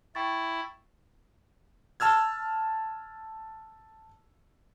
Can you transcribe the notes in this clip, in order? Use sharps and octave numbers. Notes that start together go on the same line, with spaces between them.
E4 G5 C#6 A6
A5 E6 F6 G#6